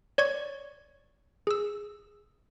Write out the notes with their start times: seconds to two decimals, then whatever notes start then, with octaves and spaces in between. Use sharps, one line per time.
0.18 C#5 D5 C#6 G#6
1.47 G#4 E6